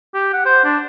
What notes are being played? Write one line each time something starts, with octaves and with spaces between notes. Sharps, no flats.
G4
F#5
C5
D4